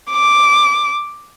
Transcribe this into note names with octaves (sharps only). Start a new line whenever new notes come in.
D6